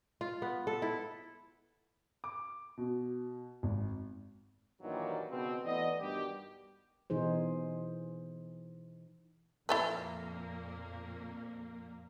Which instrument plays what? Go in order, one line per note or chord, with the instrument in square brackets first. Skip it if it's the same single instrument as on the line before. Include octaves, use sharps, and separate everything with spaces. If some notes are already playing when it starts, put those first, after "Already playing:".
[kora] F4
B3
A4
E4
[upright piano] D6
B2
G#1
[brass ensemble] G2 A#2 D#3 E3 F#3 G3
C#2 B2 C4
E3 A3 B3 D5 D#5
G2 B2 D#3 G3 G4
[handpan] B2 E3 D#4 G#4 C5
[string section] F2 A#2 A#3 [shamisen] E4 A4 B4